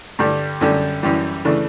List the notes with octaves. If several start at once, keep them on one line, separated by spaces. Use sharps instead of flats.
G2 D3 G3
F#2 D3 G3
F#2 E3 G3
C#3 E3 A3 D4